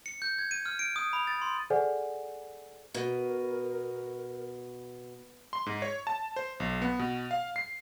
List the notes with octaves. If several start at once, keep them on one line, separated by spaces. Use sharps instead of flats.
C#7
G6
G#6
D#7
F6
D7
D#6
B5
A6
C6
G#4 A4 C5 D5 F#5 G#5
B2 A#4
C6
G#2
C#5
A5
C5
B1
B3
B2
F5
C7